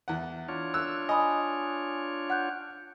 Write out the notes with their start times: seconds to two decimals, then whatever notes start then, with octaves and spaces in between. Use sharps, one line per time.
0.08 E2 F#5
0.48 D4 F4 C#5
0.74 E6 F#6
1.09 D#5 G#5 B5 D#6
2.30 F#5 F#6 G6